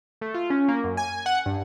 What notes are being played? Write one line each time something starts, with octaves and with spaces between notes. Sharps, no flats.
A3
F4
C#4
A#3
F#2
G#5
F#5
G2